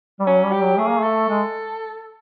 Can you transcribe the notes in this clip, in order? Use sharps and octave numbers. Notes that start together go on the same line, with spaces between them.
G3
F#3 C#4
G3
G4
F#3
A3 G#4
A#3
A3 A4
G#3